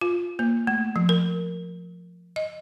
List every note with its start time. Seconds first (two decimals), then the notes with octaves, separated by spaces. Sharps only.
0.01 F4
0.39 A#3
0.67 A3
0.96 F3
1.09 A#4
2.36 D#5